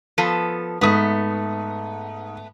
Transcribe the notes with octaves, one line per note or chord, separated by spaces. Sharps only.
F3 B3 A4
G#2 A3 B3 D#6